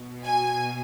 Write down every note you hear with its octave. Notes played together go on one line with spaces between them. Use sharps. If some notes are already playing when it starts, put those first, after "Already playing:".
Already playing: B2
G#5